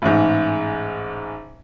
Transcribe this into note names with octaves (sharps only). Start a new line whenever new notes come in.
A1 G#2